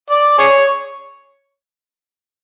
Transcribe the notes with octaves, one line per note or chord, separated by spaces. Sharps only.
D5
G#4 C#5